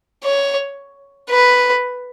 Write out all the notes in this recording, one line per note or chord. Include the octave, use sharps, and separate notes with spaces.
C#5
B4